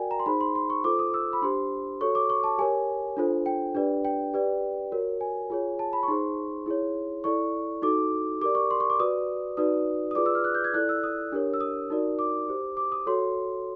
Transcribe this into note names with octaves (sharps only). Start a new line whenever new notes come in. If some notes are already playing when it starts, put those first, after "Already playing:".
Already playing: F#4 A#4 D5 G5 G#5
A#5
C6
D#4 G#4 C5 B5
C6
C6
C#6
F4 A4 C5 D6
D#6
E6
B5
D4 G4 C5 C6
F#4 A4 C#5 C#6
D6
C#6
A5
G4 A#4 C#5 G#5
D4 F4 A4 C5
G5
D4 G4 B4 D5
G5
G4 B4 D5
F#4 A#4 C#5
G#5
F4 G#4 C#5
A5
B5
C#6
D#4 G#4 C5 C6
E4 G#4 C#5
E4 A4 D5 C#6
D#4 F#4 A4 D6
G4 A#4 D5 D6
C#6
C6
C#6
D6
F#4 B4 D5 D#6
D#4 F#4 B4 D5 D#6
D#6
F4 G#4 B4 D5 D6
E6
F6
F#6
G6
G#6
E4 A4 D5 F#6
E6
D#6
D4 G4 A#4 C#5
E6
D#6
D#4 F#4 A#4 D5
D6
G4 C5
D6
D#6
F#4 A4 C#5 C6